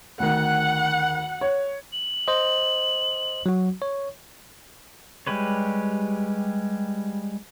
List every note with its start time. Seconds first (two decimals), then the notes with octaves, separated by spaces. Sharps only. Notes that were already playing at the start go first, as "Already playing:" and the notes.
0.20 D2 D#3 F#5
1.41 C#5
1.93 F#7
2.28 C5 D#5
3.46 F#3 F#4
3.82 C#5
5.27 G3 G#3 G4 B4 C#5